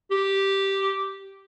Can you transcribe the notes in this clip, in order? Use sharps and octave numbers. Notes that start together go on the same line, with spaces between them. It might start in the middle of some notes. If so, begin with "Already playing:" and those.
G4